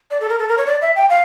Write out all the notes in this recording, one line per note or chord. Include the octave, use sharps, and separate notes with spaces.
D5
A4
A#4
A4
A#4
C#5
D5
E5
G5
F5